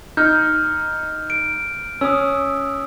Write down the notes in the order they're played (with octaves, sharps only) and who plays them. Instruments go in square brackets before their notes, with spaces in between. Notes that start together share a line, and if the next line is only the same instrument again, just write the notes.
[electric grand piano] D#4 [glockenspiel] F6 G6
[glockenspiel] D7
[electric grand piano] C#4 [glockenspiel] D#6 E6